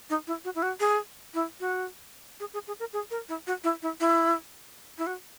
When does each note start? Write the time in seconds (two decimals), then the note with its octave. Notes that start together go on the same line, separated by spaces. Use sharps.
0.10 D#4
0.27 E4
0.44 F#4
0.55 E4
0.62 F#4
0.80 G#4
1.34 E4
1.60 F#4
2.40 G#4
2.53 G#4
2.67 G#4
2.80 A#4
2.93 G#4
3.11 A#4
3.29 E4
3.47 F#4
3.64 E4
3.82 E4
4.00 E4
4.98 E4
5.07 F#4